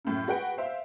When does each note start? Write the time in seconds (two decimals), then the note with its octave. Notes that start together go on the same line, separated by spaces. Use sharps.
0.05 F#2 A2 C#3
0.28 F#4 G#4 B4 F#5 G5 D7
0.58 C5 E5 F5